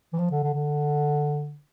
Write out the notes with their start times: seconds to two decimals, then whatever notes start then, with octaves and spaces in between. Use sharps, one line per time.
0.13 E3
0.19 F3
0.31 D3
0.43 D3
0.54 D3